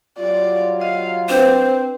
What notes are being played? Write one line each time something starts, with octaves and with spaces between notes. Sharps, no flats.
F#3 G3 F4 D5
D#5 F5
C4 D4 B4 C5